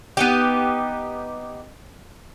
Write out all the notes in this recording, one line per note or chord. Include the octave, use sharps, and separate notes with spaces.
B3 D#4 G4